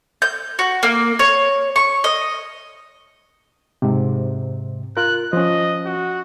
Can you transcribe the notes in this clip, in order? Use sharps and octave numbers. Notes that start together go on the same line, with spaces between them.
G6
F#4
A#3
C#5
C#6
D#5
G#2 C3
F4 A#4 F#6
F3 C#4 D#5
F#4